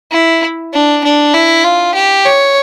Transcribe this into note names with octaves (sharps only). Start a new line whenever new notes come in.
E4
D4
D4
E4
F4
G4
C#5